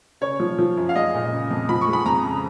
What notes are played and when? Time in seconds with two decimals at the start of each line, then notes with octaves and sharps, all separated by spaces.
0.21 C#3 C#5
0.40 F3
0.59 F3
0.77 F#2
0.89 F5
0.95 G#3 D#5
1.14 A#2
1.32 C#3
1.51 F2
1.69 F3 B5
1.81 C#6
1.87 G#3
1.93 B5
2.06 F2 A#5
2.24 C#3